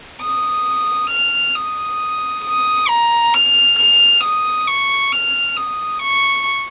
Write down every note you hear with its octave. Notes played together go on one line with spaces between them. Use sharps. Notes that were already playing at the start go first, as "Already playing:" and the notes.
D#6
F6
D#6
D#6
A#5
F6
F6
D#6
C#6
F6
D#6
C#6